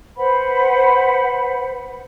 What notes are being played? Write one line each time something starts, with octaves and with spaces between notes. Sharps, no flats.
B4 C5 F#5 B5